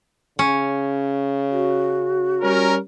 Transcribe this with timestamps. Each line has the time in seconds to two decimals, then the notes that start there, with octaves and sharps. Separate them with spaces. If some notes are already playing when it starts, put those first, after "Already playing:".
0.39 C#3 C#4
1.51 F#4
2.42 G3 C#4 A#4